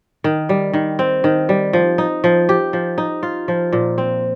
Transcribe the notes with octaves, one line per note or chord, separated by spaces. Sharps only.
D#3
G3
D#3
C4
D#3
G3
F3
D#4
F3
G4
F3
D#4
F4
F3
A#2
C4